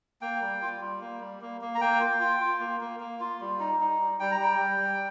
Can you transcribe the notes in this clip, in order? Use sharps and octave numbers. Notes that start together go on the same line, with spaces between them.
A#3 G5
G3
F4
G3
A#3
G3
A#3
A#3
A#5
A#3 G5
F4
F4
F4
A#3
A#3
A#3
F4
G3
D#4
D#4
G3
G3 G5
A#5
G3 G5
G3
G3